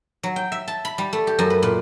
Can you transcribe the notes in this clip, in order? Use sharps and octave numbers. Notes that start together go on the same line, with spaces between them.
F#3
G5
E5
A5
B5
G3
A3
G4
F#2
B4
A#2